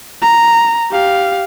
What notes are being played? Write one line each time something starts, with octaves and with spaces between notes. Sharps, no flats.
A#5
G4 F5